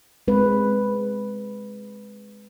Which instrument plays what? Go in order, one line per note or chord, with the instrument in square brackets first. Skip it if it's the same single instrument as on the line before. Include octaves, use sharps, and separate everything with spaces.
[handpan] G#3 C4 B4